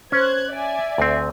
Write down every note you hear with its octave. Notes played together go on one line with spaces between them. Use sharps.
C#4 C5 F#6 G#6
D5 E5 G#5
D2 C4